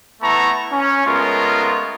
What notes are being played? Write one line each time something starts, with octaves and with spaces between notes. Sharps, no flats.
A3 B3 E4 A5 A#5 C#6
C#4
G#3 A3 B3 C#4 F4 A#4